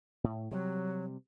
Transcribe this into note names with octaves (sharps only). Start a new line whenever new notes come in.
A2
C3 F#3 G3